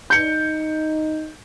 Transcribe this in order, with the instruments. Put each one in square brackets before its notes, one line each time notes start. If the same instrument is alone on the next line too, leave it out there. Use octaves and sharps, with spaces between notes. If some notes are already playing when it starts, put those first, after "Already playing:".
[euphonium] D#4 [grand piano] G6 C#7